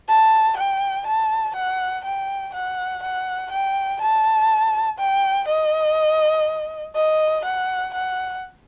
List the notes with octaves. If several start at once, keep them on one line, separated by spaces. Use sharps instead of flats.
A5
G5
A5
F#5
G5
F#5
F#5
G5
A5
G5
D#5
D#5
F#5
F#5